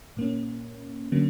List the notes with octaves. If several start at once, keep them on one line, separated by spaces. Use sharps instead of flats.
A#2 A#3 C#4
D3 F#3 A#3 C#4